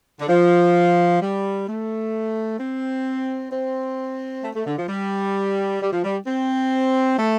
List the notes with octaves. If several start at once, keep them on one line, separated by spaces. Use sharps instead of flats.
D3
F3
G3
A3
C4
C4
A3
A3
D3
F3
G3
G3
F3
G3
C4
A3